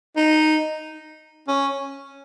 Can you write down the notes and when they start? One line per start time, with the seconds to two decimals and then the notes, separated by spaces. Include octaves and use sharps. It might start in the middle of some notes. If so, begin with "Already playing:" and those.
0.16 D#4
1.48 C#4